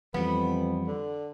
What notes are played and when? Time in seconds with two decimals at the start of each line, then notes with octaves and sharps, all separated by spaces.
0.14 F2 E3 G3 B3 B4
0.87 D3